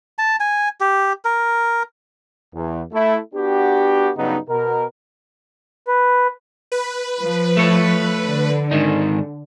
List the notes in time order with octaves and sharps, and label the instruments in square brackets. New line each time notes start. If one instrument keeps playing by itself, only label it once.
[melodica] A5
G#5
G4
A#4
[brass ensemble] E2
A3 E4
B3 D4 F#4 G4
G2 C#3 F#3 B3 D#4
B2 A#4
[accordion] B4
[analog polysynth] B4
[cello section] F3
[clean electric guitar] A3 C#5
[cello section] D3
[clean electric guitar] G#2 D#3 D#4